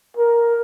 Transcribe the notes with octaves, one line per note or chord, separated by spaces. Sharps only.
A#4